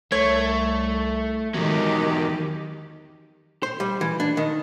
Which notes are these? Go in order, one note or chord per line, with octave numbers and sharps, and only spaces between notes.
C2 A3 C#5
E2 D#3 F#3 G#3 G4
C5
G3
E3
D4
D#3